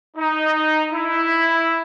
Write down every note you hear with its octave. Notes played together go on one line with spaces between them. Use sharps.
D#4
E4